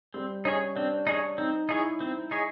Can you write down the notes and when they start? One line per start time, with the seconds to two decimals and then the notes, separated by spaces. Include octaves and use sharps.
0.14 G3 C4
0.45 C#4 D#4 G#4 C#5
0.75 C4 D4
1.07 D#4 G#4 C#5
1.38 C4 D#4
1.69 D#4 E4 G#4 C#5
2.01 C4
2.31 D#4 G#4 C#5